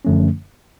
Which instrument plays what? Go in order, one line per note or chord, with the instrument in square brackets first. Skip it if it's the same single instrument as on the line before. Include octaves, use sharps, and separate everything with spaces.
[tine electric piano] F#2 D3 F3 A3 C#4